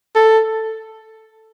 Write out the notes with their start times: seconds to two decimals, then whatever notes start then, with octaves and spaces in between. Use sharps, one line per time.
0.16 A4